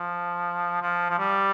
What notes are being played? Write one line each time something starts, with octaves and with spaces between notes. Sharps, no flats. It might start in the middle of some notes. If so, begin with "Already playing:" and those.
Already playing: F3
F3
F3
G3